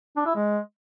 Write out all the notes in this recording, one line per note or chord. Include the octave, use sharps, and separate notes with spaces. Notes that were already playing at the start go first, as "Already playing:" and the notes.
D4
E4
G#3